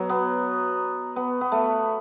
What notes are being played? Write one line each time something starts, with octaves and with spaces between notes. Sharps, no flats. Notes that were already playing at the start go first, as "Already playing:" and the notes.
Already playing: B2 F#3
B3
B3
B3
A3